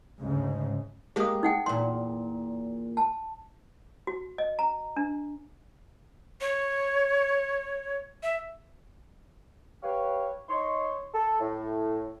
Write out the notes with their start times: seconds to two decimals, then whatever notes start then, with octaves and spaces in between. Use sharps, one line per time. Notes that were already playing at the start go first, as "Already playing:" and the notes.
0.20 D2 G#2 C#3
1.16 G#3 A#3 G4 G#4 D#6
1.43 D#4 F#5 G5
1.66 E2 A#2 C6
2.97 A5
4.07 F#4
4.38 D#5
4.59 A#5
4.97 D4
6.41 C#5
8.23 E5
9.83 G4 B4 C#5 F5
10.49 D#4 C#5 C6
11.14 A4
11.40 A2